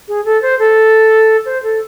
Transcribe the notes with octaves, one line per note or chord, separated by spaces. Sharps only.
G#4
A4
C5
A4
C5
A4